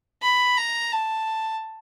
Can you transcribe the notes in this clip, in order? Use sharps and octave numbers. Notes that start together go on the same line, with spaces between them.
B5
A#5
A5